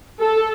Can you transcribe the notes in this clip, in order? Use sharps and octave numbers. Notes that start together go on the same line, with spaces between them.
A4